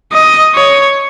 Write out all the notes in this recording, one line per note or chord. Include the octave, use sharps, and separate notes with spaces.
D#5
C#5